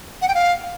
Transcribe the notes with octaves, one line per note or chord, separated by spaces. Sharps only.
F#5
G5
F5